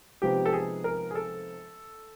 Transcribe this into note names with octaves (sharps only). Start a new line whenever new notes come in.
C3 F3 G#3 B3 D#4 G4
A4
G#4
A#4
G#4
A4